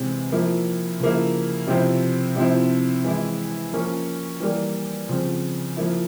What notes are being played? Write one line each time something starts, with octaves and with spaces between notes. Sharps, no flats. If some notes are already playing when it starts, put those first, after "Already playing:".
Already playing: C3 E3 G#3 C4 E4
F3 A#3 E4
C#3 F3 A#3 E4
C3 F3 C4 E4
C3 F3 C4 E4
E3 G#3 E4
F3 A#3 C#4
E3 G3 A#3
C#3 F3 C4
F3 A#3 E4